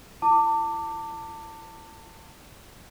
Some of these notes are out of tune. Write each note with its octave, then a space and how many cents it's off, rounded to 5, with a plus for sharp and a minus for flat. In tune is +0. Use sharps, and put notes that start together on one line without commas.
E4 +40 A5 +30 D6 +0